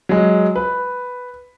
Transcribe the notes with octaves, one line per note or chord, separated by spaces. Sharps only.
F#3 G#3
B4